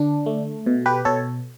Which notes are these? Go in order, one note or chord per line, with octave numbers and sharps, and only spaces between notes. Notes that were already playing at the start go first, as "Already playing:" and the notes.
Already playing: D3 D4
A3
B2
G4 B4
B2 A4 C#5